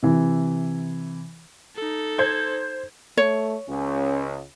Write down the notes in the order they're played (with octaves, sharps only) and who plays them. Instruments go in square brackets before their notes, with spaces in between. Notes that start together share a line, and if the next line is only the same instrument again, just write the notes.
[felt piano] C3 E3
[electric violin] D#4 A4
[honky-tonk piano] C5 G#6
[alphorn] A3 [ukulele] C#5
[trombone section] C#2 [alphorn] C#4